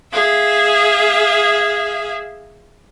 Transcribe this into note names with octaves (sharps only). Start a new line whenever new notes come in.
G#4 E5 F5